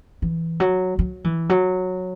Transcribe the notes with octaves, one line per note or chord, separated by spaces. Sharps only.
E3
F#3
F#3
E3
F#3